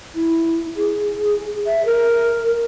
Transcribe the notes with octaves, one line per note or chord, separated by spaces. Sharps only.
E4
G#4
E5
A#4